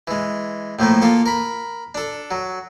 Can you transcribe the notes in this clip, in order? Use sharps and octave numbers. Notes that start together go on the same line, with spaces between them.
E3 G#3
A2 F3 A3 A#3
A#3 F4 A4
A#4 B5
D4 A4
F#3